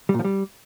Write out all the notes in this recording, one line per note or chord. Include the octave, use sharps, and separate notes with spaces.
G3
A#2
F3
G3